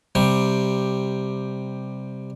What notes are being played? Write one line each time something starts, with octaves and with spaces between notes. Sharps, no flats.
C3 G3